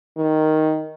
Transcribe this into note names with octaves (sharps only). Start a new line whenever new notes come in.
D#3